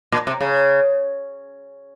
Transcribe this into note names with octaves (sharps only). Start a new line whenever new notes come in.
A#2
C3
C#3